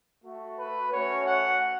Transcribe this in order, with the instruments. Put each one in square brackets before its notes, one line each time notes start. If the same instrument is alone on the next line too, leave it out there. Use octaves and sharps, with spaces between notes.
[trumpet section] A3 F#4
B4
A3 C#4 F#4 C#5
F#5